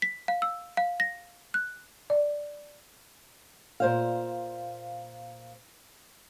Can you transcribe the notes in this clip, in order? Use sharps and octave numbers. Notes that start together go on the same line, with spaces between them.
B6
F5
E6
F5
A#6
F#6
D5
A#2 C5 F5